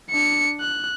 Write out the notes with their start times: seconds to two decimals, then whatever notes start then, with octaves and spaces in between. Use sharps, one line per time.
0.11 D4 C#7
0.61 F#6